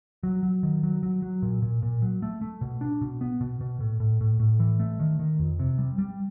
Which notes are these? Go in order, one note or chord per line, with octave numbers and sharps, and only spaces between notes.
F#3
F#3
D#3
F#3
F#3
F#3
A#2
A#2
A#2
F#3
A3
A3
B2
D4
B2
B3
B2
B2
A2
A2
A2
A2
E3
A3
D#3
D#3
F2
C3
G3
G3